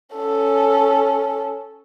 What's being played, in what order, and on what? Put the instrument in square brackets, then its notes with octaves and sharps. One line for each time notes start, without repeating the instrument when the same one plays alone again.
[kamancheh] C#4 A4